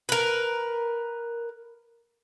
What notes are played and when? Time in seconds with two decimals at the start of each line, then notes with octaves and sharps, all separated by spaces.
0.09 A#4 B4